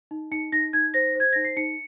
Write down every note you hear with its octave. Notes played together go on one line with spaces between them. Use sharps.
D#4
D#4 C#7
D#4 A#6
D#4 G#6
C5 A#6
C5 G#6
D#4 A#6
C7
D#4 C#7